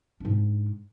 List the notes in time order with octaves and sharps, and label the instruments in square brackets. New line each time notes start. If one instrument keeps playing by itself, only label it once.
[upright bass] G#2 D4